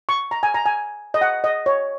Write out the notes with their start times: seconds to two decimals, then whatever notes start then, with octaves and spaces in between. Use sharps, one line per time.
0.09 C#6
0.31 A#5
0.43 G#5
0.54 A#5
0.66 G#5
1.14 D#5
1.21 F#5
1.44 D#5
1.66 C#5